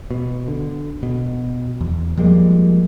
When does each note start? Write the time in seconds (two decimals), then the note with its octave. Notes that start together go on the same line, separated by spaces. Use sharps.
0.11 B2
0.48 D3
1.03 B2
1.81 E2
2.17 F3 G3 G#3 A#3